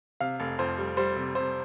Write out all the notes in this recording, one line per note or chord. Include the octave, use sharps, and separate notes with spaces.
C3 F5
F1
F2 C5
G3
G3 C5
C3
C3 C5